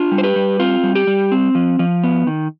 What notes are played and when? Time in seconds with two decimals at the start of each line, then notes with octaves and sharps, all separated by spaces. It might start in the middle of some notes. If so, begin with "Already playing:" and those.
Already playing: D4 F4
0.12 G3
0.18 C5
0.23 G4 B4
0.36 G3
0.59 C4 F4
0.83 G3
0.96 G4
1.07 G3
1.32 C4
1.55 F3
1.79 F3
2.03 B3
2.27 D#3